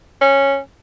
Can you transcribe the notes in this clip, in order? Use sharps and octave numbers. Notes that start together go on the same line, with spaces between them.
C#4